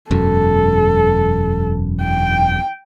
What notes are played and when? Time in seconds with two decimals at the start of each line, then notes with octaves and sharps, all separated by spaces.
0.11 E1 F#2 A4
2.02 G5